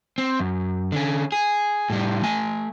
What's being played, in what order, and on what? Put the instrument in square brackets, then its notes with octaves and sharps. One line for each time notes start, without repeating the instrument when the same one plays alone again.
[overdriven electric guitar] C4
F#2
D3 C#4
G#4
A2 G3
A3 G#5